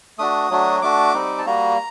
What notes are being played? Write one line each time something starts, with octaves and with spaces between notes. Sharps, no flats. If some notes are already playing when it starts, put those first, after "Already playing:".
A3 D4 F#4 D#6
F#3 A3 D4 F#4
A3 D4 F#4 D6
G3 C4 D#4
A5
G3 A#3 F#4 A#5